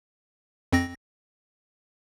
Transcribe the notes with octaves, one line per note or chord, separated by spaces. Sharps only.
F2 C4 A#6